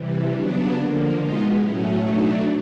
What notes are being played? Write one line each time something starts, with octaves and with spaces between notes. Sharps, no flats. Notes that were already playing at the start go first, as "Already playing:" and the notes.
Already playing: C3 E3 G3
C#3 F#3 B3 D4
D3 F3 A#3
B2 G#3 B3 D#4 F4
A2 F#3 A3 C#4
B2 F#3 A3 D4 D#4